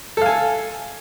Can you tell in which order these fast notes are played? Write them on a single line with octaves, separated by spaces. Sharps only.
A4 F5 G#5